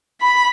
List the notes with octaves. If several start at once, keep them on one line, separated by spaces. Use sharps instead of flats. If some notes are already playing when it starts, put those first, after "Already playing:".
B5